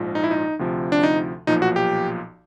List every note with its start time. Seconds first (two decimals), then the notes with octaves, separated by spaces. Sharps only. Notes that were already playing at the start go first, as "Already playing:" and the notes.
Already playing: A#1 G#2 F3
0.15 D#4
0.24 E4
0.31 D#4
0.59 D2 C3 F3
0.92 D4
1.03 D#4
1.47 B1 A#2 F3 D#4
1.62 F#4
1.76 G4